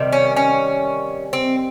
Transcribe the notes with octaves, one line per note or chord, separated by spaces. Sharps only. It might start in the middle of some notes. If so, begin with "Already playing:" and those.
Already playing: C3 D#3 G3
C#4
C#4
C4